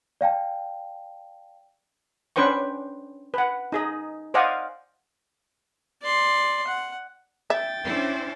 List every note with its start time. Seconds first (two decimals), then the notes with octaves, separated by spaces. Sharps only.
0.21 D5 F5 G5 A5
2.36 C#4 D4 B4 C5 G5 C#6
3.34 B4 F#5
3.72 D#4 G#4 D#5
4.34 C5 D5 D#5 F5 F#5 G#5
6.03 D5 C6
6.67 F#5
7.50 E5 G5 A6
7.84 C#4 D4 E4 C5